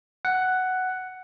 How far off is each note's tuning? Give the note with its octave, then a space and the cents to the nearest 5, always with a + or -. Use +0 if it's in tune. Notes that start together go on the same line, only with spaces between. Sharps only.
F#5 +5